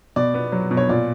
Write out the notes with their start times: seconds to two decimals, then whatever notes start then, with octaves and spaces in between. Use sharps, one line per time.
0.16 B2 D5
0.34 B3
0.52 F#3
0.71 B2
0.77 C#5
0.89 A#2 D5